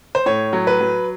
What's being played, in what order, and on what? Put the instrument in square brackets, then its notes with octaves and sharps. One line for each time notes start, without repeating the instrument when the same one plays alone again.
[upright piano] C5
A2 C#5
F#3
B4
F#3